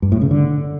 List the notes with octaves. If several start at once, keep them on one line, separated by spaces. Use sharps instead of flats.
G2
A2
C#3
D3